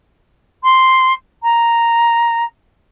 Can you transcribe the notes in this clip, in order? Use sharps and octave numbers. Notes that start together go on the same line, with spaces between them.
C6
A#5